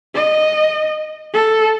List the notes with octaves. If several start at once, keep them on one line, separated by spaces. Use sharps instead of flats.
D#5
A4